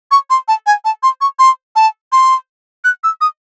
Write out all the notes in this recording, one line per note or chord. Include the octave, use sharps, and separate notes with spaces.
C#6
C6
A5
G#5
A5
C6
C#6
C6
A5
C6
F#6
E6
D#6